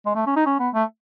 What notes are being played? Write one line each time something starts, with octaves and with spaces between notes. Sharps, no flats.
G#3
A3
C#4
D#4
C#4
B3
A3